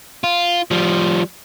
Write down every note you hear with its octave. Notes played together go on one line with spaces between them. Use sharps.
F4
F3 G3